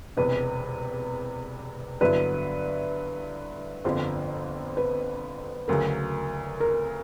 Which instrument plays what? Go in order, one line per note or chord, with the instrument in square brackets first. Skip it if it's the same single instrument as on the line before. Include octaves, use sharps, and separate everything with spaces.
[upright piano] E1 E2 C3 [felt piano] B4
[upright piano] G2 D3 F#3 B3 E4 [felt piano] B4
[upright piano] G1 F2 D3 F3 [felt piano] C5
[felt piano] B4
[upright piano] D2 C#3 F#3 [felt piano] A#4
[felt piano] A#4